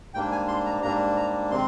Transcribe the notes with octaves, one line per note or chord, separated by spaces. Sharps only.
G#2 G3 A#3 D4 G5
G#5
C6
A#5
G#2 G3 A#3 D4 A#5
A#5
C3 D#3 G#3 C4 C6